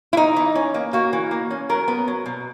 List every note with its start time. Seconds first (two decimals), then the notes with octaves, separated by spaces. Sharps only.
0.13 E4
0.17 E3 D#4
0.36 E3
0.55 C#4
0.74 A#3
0.93 A#3 F#4
1.13 E3
1.31 A#3
1.51 C#4
1.69 F#3 A#4
1.88 B3
2.08 F#3
2.26 B2